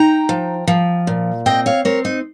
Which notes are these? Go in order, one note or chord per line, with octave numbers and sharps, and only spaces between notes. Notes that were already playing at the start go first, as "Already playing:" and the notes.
Already playing: D#4 G5 A#5
F3
F3
A#2
C4 D#5 G5
C#5 F5
C4 A#4 C#5
D#4